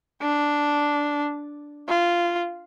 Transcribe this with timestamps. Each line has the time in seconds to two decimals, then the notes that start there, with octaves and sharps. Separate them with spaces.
0.22 D4
1.88 F4